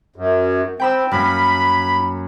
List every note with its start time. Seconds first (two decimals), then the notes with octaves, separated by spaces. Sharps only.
0.16 F#2
0.80 C4 G5 B5 E6
1.11 F#2 A#3 B5